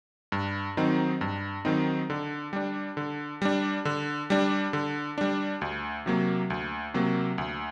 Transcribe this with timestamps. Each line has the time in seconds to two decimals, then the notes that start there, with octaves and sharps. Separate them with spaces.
0.32 G2
0.77 D#3 F#3 C4 D#4
1.21 G2
1.65 D#3 F#3 C4 D#4
2.10 D3
2.53 G3 D4
2.97 D3
3.42 G3 D4
3.85 D3
4.30 G3 D4
4.73 D3
5.18 G3 D4
5.61 D2
6.06 C3 F#3 A#3
6.50 D2
6.94 C3 F#3 A#3
7.38 D2